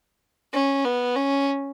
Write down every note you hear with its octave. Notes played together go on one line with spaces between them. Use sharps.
C#4
B3
C#4